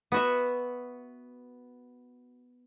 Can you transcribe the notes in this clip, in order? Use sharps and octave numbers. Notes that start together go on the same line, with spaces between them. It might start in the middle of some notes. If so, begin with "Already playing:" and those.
B3 F#4 E5